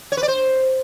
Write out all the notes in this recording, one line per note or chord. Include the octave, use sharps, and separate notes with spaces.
C#5
B4
D5
C5